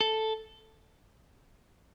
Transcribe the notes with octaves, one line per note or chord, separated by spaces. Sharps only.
A4